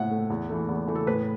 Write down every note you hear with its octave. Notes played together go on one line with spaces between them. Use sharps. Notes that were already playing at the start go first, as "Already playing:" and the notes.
Already playing: A2 A3 E5 F#5
A3
E2
E3 A3
E2
E3 A3
A4
A2 B4